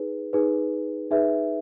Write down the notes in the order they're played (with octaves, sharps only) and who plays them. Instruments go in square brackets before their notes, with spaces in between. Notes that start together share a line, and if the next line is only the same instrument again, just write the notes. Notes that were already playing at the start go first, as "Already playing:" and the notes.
Already playing: [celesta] D#4 G#4 B4
D#4 G#4 B4
D#4 G#4 B4 E5